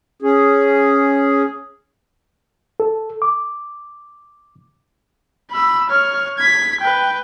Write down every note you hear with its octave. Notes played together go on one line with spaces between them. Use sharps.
C#4 G#4
A4
D6
B5 E6
C#5 F6
G#6 B6
B4 G5